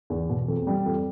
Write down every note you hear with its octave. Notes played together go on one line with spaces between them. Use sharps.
E2
B2
F2
G3
F2